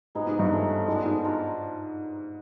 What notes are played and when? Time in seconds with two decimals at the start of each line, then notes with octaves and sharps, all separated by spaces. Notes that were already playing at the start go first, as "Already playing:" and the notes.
0.15 G#2 B3 D#4 G#4
0.27 G#2
0.39 G2
0.52 A3 C#4 F4 A4
0.87 G#2 G#3 B3 D4 F#4
1.05 G#2
1.24 D4 F4 A#4